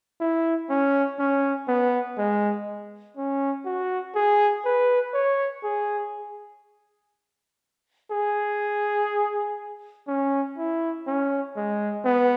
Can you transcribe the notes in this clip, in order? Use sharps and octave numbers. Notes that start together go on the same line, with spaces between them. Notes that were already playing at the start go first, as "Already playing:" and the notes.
E4
C#4
C#4
B3
G#3
C#4
F#4
G#4
B4
C#5
G#4
G#4
C#4
E4
C#4
G#3
B3